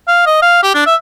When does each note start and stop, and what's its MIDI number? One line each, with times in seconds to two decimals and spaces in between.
0.08 0.23 77
0.26 0.39 75
0.42 0.60 77
0.63 0.73 67
0.75 0.85 62
0.87 0.95 76